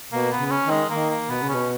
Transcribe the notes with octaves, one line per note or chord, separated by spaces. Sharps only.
B2 A#3
B3
C#3
B3
C#4
D#3
G#3
D#3 A#3
A#3
B2 B3
C#3
C#4
B2